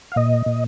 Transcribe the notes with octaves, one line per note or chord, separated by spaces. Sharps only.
F5
A#2 D#5
A#2